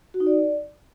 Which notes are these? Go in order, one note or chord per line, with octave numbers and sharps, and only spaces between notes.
F#4
D#4
D5